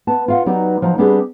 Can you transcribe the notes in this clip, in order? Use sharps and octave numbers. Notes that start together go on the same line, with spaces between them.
B3 A5
F4 F5 F#5
F#3 B3 D#4 G4 D5
F3 F#3 D#4
G3 B3 C4 D4 G4 G#4